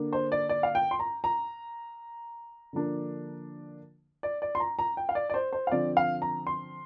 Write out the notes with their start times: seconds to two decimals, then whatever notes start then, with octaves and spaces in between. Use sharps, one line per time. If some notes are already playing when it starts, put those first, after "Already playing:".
Already playing: D3 A#3 D4
0.13 C5
0.32 D5
0.49 D5
0.63 F5
0.75 G5
0.91 C6
1.00 A#5
1.24 A#5
2.73 D3 F3 A#3 D4
4.23 D5
4.42 D5
4.55 C6
4.60 A#5
4.79 A#5
4.97 G5
5.09 F5
5.15 D5
5.30 D5
5.34 C5
5.53 C5
5.67 F5
5.72 D3 F3 C4 D5
5.97 F5
6.22 A#5
6.47 C6